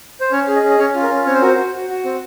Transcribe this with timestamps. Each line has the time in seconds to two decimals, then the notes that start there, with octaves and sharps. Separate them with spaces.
0.20 C5
0.31 C#4 C#5
0.48 G#4
0.56 D#5
0.63 C#4
0.70 D#5
0.78 C#4 C#5
0.95 F4
1.03 A#4
1.10 C#4
1.26 C4 C#5
1.34 C5
1.42 F#4 A#4
1.49 C5
1.58 F#4
1.74 F#4
1.89 F#4
2.04 C4